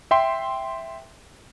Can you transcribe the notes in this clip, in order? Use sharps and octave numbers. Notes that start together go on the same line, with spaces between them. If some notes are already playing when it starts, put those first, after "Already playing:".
E5 G5 C6